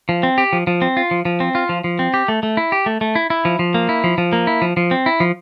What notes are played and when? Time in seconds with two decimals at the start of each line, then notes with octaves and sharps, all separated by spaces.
0.09 F3
0.23 C4
0.38 G4
0.53 F3
0.67 F3
0.82 C4
0.97 F4
1.11 F3
1.25 F3
1.40 C4
1.55 F4
1.69 F3
1.84 F3
1.99 C4
2.14 G4
2.28 A3
2.43 A3
2.57 E4
2.72 G4
2.86 A3
3.01 A3
3.15 E4
3.30 E4
3.45 F3
3.59 F3
3.74 A#3
3.89 E4
4.04 F3
4.18 F3
4.33 A#3
4.47 E4
4.62 F3
4.77 F3
4.91 C4
5.06 E4
5.20 F3